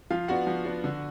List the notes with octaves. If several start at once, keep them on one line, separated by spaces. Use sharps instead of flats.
F3 F4 F5
B3 D4 F#4 F#5
F3
B3 D4
D3